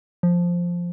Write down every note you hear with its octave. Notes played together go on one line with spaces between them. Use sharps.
F3